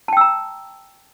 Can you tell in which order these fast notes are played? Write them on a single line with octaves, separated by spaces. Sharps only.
A5 G5 E6 A#5